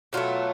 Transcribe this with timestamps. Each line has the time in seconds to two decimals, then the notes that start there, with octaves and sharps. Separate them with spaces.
0.13 B2 F#3 A3 F4